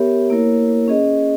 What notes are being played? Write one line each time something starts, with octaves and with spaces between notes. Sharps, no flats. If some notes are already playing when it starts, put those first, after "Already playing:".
Already playing: B3 G4 A#4 C#5 E5
A#3 E4 A#4 C#5
C#4 G#4 D#5